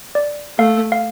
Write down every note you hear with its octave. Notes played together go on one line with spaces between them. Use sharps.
D5
A3 F5
F5